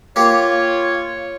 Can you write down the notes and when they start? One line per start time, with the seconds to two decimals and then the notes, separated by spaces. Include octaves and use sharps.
0.16 A#3 F4 G4 C#5